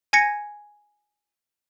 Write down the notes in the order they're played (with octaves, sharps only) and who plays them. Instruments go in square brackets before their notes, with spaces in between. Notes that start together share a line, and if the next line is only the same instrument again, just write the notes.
[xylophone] G#5 G#6 A#6 C#7